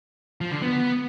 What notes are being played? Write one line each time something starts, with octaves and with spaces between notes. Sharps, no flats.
F3
D3
B3